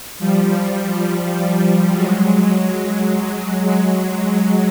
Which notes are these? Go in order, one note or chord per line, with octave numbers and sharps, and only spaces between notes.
F3 G3
F#3 G#3